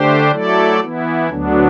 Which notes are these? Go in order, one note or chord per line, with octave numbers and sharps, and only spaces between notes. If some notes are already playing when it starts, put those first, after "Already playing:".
Already playing: D3 A3 D4 G4 C5
F#3 A3 E4 A4 D5
E3 B3 E4
D2 D3 F#3 B3 D4